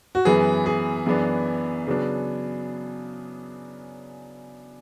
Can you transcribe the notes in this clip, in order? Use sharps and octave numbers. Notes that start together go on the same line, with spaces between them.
F#4
F#2 E3 B3 G#4
G#4
F#2 E3 B3 D4 G#4
C#3 F#3 B3 D4